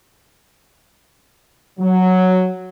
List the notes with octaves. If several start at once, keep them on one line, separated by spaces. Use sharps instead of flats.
F#3